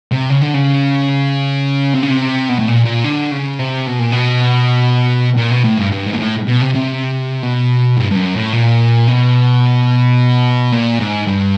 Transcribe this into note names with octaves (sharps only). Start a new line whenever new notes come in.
C3
C#3
D3
C#3
C3
C#3
C3
B2
A2
A#2
A#2
D3
C#3
C3
B2
A#2
B2
A#2
B2
A2
G2
G2
G#2
A#2
A2
B2
C3
C3
B2
G2
G2
F#2
A2
A#2
B2
A#2
G#2
G2